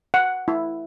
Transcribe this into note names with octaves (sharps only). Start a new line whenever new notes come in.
F#5
E4